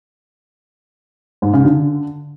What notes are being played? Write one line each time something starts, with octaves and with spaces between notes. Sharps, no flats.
G#2
C#3
D3